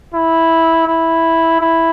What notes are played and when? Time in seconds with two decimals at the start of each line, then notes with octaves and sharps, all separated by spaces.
0.14 E4
0.88 E4
1.61 E4